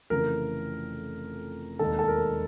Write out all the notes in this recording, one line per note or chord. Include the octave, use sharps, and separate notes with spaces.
F1 F2 C#3 E3 A#4
E1 D#2 D#3 A4
A4
A#4